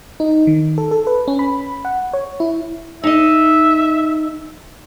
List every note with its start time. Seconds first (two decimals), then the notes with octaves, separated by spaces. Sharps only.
0.20 D#4
0.47 D#3
0.78 A4
0.91 A4
1.07 B4
1.28 C#4
1.39 B5
1.85 F#5
2.14 C#5
2.40 E4
3.04 D#4 D#5 E5